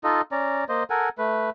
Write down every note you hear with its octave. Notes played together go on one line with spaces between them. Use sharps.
D#4 F4 A4 D#5
C#4 D5 A#5
A#3 C5 D#5
A4 A#4 F#5 G#5
A3 B4